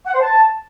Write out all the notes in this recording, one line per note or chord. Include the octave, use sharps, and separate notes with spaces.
F#5
C5
A5